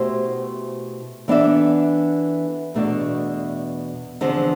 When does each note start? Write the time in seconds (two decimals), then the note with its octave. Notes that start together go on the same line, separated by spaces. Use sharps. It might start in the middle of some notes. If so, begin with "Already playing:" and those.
Already playing: B2 A3 E4 G4 C5
1.28 E3 B3 D4 A4 E5
2.74 E2 B2 A3 D4
4.21 E2 D3 F3 C4